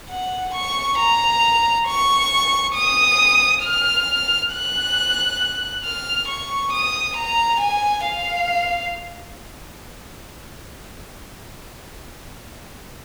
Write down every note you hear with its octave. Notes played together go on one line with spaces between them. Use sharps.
F#5
C#6
A#5
C#6
D#6
F6
F#6
F6
C#6
D#6
A#5
G#5
F5